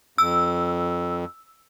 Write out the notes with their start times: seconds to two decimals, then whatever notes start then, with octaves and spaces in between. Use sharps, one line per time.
0.18 F2 E6